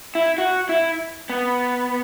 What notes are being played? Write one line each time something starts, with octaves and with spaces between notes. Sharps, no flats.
E4
F#4
E4
B3